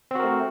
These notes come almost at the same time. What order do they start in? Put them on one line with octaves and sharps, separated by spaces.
C4 F#4 A#4 A3